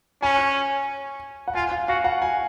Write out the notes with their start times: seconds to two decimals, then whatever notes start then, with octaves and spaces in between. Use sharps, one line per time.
0.22 C#4 G#5
1.48 F#5
1.55 F4 G#5
1.72 F5
1.88 F#4 F5
2.04 F#5
2.22 G#5